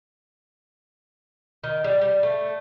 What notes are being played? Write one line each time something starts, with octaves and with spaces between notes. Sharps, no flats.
D#3
G3
G3
A3